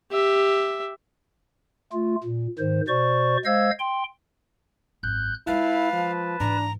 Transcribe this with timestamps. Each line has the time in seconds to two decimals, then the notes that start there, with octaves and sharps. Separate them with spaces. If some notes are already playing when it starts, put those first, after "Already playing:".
0.11 G4 E5
1.93 A3 F4
2.24 A#2
2.59 G#2 D#3 C5
2.88 B2 C5 D5 C#6
3.45 G#3 C5 D#5 F5 E6 G#6
3.79 G5 C6
5.03 G#1 F#2 F#6 G6
5.47 G#3 E4 F4 B4 F5 A5
5.93 F3
6.40 G#2 E3 D4 A#5